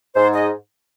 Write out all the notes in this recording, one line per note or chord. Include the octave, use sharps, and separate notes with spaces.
G#2 C5
D#5